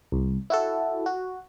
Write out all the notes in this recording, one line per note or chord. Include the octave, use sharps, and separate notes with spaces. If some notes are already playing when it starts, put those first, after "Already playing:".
C2
E4 F#4 A4
F#4